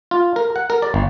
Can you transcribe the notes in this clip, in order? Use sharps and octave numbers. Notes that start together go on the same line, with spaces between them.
F4
A#4
F#5
A#4
D5
G1